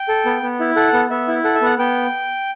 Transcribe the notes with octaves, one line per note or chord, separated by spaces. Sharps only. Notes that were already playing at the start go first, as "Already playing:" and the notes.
Already playing: G5
A4
B3
B3
E4
A4 F#5
B3
B3 E5
E4
A4 F#5
E5
B3 F#5
B3 G5